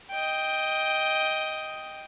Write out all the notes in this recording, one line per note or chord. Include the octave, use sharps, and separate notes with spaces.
D#5 G5